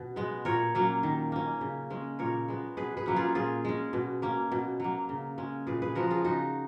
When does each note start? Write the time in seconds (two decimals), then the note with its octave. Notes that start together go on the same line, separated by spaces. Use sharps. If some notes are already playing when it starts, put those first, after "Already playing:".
Already playing: B2 C#4
0.16 G#3 B3
0.45 A#2 A#4 C#5
0.75 F#3 A#3 C#4
1.03 D#3
1.32 A#3 C#4
1.61 C#3
1.90 G#3 C#4
2.19 A#2 A#4 C#5
2.48 G#3 B3
2.77 B2 G#4 B4
2.97 G#4 B4
3.06 F#3 A#3 C#4
3.16 F4 G#4
3.35 A#2 F4 G#4
3.65 G#3 C#4
3.93 B2
4.22 A#3 C#4
4.52 B2
4.80 F#3 A#3
5.09 C#3
5.38 G#3 C#4
5.67 A#2 G#4 B4
5.82 G#4 B4
5.95 F3 G#3 F#4 A#4
6.10 F4 G#4
6.24 C#3 D#4 F#4